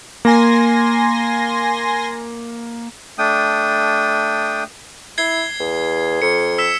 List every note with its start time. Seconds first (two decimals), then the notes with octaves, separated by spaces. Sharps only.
0.25 A#3 G#5 C6 A#6
3.18 A3 D4 G5 D#6
5.18 E4 G#6 C7 G7
5.60 E2
6.22 F2 C#7
6.58 E6 B6 E7